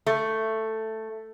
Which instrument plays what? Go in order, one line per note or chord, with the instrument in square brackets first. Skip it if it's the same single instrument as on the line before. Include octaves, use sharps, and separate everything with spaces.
[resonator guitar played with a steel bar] A3